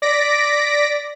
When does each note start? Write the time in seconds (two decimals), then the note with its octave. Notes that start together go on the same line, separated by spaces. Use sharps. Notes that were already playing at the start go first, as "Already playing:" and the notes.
0.02 D5 A#6 B6 D7